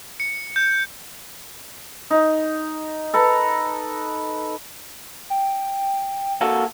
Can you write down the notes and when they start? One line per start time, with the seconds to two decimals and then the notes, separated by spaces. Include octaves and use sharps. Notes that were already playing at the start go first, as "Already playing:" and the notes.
0.20 C#7
0.56 G6
2.10 D#4
3.14 A4 B4 A#5
5.30 G5
6.41 A#3 F#4 A4